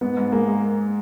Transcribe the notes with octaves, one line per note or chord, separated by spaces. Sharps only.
G#2 B3
G#2
G#3 A#3
G#3